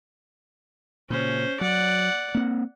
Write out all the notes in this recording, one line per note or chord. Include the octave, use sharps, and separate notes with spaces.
A#2 C#3 C#4 C5
F#3 D5 F#5
A#3 C4